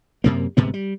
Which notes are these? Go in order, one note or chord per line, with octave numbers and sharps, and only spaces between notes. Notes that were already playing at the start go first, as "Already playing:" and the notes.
F#2 C3 A#3
G1 G#2 C3 B3
G3